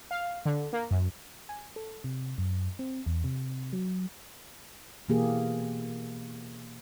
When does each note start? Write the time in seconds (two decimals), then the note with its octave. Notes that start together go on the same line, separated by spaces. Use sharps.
0.11 F5
0.45 D3
0.73 A#3
0.91 F#2
1.49 G#5
1.76 A4
2.04 C3
2.38 F#2
2.79 C4
3.06 E2
3.24 C3
3.73 F#3
5.08 B2 E3 A#3 G4 G#4